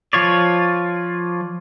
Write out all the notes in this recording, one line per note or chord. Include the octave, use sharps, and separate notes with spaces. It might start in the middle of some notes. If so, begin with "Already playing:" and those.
F3 F4 C#5 D5